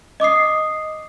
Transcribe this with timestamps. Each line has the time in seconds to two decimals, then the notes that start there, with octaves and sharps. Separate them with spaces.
0.20 D#5 D6 D#6 C7